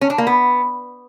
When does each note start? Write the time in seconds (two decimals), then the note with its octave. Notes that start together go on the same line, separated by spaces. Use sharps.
0.01 C#4
0.10 D4
0.18 A#3
0.27 B3